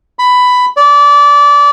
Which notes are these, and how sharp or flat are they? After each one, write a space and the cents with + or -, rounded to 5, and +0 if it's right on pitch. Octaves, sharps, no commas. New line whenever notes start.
B5 +10
D5 -25